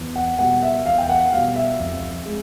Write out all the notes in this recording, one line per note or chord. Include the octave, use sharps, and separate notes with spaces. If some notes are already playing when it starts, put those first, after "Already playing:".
Already playing: E2
F#5
B2 G3 F#5
E5
E2 F5
G5
F#5
B2 G3 F5
E5
F2
G#3